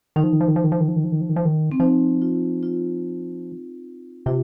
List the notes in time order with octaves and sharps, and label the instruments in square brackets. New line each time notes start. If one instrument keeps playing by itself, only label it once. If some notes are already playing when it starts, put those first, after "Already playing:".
[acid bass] D#3 [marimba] D#4
[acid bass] F3
D#3
F3
D#3
F3
D#3
F3
D#3
F3
D#3
F3
D#3
F3
D#3
F3
D#3
[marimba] C4
[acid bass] F3 [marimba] D#4
[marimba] F4
F4
[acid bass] C3 [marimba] F4